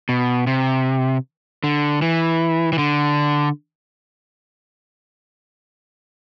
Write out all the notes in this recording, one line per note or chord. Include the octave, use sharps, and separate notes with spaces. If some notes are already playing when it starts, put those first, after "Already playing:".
B2
C3
D3
E3
E3
D3